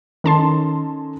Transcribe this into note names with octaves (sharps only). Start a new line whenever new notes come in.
D#3 C#4 D#4 A4 A5 C6